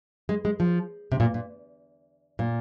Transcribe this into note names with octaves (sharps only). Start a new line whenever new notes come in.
G#3
G#3
F3
C3
A#2
A#2
A#2